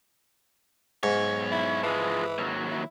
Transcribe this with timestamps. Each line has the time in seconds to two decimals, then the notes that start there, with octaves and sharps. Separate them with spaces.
1.03 B1 G#2 C#5
1.51 E4
1.83 E3 F3 G#3
2.38 D#2 F#3
2.71 E4